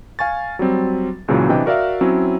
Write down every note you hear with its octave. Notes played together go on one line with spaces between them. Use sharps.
F5 G#5 C#6 A6
F#3 G3 C4
C#2 A#2 C#3 E3 F#3
C3 E3 D4 D#5 G5
F#4 A#4 D5 E5 F5
F#3 C4 C#4 E4